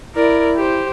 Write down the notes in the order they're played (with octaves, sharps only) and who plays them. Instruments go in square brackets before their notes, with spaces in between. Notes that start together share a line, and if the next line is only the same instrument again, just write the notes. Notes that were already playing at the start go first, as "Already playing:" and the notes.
[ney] E4 [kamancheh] A#4 D5
[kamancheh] G4 C5